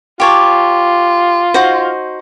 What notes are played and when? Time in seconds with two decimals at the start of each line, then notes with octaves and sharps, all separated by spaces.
0.20 F4 G4 C#5 A5
1.54 D#4 F#4 C5